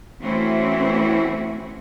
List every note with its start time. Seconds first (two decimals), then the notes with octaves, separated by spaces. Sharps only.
0.21 E3 A3 C4 C#4 E4 F#4